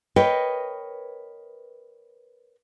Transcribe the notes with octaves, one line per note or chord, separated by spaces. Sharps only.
A#4 B4 C#5 D#5 G5